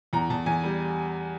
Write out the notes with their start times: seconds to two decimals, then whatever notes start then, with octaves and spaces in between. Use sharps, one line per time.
0.13 E2 A#5
0.30 E2 A5
0.46 E2 G#5
0.63 G3